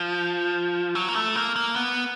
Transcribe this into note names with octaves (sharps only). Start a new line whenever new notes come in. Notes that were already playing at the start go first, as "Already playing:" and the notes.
Already playing: F3
F#3
A#3
A3
A#3
A#3
B3